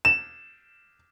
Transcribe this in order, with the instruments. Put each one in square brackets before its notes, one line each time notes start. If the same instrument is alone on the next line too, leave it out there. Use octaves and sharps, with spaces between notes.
[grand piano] E7